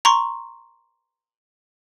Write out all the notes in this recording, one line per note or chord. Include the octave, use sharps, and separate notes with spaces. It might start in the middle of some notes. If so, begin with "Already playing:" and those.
A#5 C6 C#6